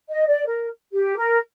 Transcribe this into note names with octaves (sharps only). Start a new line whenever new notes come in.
D#5
D5
A#4
G4
A#4